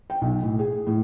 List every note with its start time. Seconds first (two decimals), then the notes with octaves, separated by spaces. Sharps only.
0.10 G5
0.21 B1
0.43 A2
0.59 G#4
0.87 A2